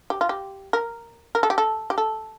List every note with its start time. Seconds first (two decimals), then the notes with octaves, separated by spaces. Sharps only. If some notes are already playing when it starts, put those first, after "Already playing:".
0.10 G4
0.21 F4
0.29 G4
0.73 A#4
1.35 A#4
1.43 A4
1.50 G4
1.58 A4
1.90 G4
1.98 A4